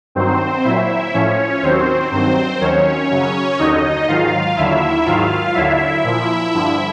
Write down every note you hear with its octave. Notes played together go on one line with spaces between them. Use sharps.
G2 D#3 F#3 C4 C5
A#2 F#3 E4 E5
A2 F3 C#4 C#5
D#2 D#3 F#3 C4 C5
G2 D#3 F#3 C4 C5
D#2 D#3 F#3 C#4 C#5
F#2 C#3 F#3
D#2 D3 F#3 D#4 D#5
G#2 D#3 F#3 F4 F5
D#2 D3 F#3 E4 E5
G#2 D#3 F#3 F4 F5
D#2 D3 F#3 E4 E5
A#2 F3
G2 D3 F3